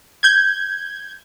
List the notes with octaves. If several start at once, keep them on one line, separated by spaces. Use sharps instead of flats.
G6 G#6